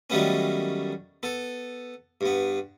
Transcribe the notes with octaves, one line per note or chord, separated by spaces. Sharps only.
F#2 D#3 G3 A3 B3 C#4
B3 A4
G2 B3